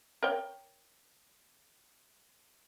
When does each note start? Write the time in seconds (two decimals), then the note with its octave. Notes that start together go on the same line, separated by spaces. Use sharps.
0.23 A#4 C#5 G5